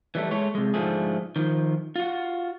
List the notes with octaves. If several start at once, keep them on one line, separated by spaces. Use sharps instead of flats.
E3 G3 A3
G#3 A3 C#5
C3 G#3
G#2 D3 F3 A3 G#4
D#3 F3
F4 F#4